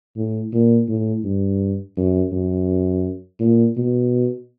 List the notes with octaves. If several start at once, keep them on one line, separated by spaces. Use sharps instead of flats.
A2
A#2
A2
G2
F#2
F#2
A#2
B2